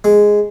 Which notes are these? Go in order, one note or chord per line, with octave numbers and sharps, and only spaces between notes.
G#3